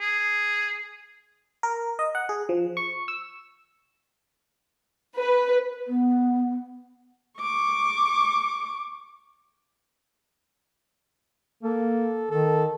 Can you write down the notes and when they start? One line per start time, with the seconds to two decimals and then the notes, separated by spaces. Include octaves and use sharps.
0.01 G#4
1.63 A#4
1.99 D#5
2.15 F#5
2.29 G#4
2.49 F3
2.77 C#6
3.08 E6
5.17 B4
5.87 B3
7.40 C#6 D6
11.63 A#3 A4
12.31 D#3 A4